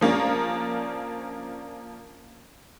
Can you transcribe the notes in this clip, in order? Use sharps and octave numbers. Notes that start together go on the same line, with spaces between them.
F3 A#3 C#4 D4